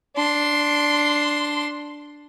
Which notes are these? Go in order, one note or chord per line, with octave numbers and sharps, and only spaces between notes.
D4 C6